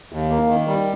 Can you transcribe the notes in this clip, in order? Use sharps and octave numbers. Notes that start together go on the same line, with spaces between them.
D#2
A#3
D#3
G3